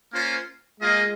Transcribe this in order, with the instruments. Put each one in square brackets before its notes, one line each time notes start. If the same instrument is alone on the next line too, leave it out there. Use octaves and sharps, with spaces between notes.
[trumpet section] A#3 C#4 F4 C5
[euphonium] G#3 [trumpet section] A#3 F4 G#4 D#5